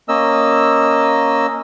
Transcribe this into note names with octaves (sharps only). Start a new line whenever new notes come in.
A#3 C#4 D#5 E6